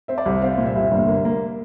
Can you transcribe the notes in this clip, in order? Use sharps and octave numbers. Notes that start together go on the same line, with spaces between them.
C4 E5
D5
C2
C4 F5
A#2
E5
C2
G1
A#3
A#3